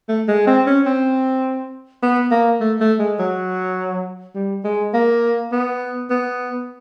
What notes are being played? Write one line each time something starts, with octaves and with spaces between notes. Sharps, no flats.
A3
G#3
C4
C#4
C4
B3
A#3
A3
A3
G#3
F#3
G3
G#3
A#3
B3
B3